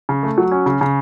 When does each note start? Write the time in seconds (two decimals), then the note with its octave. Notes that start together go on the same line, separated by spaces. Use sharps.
0.09 C#3
0.23 A3
0.38 F#3
0.52 C#4
0.66 C#3
0.81 C#3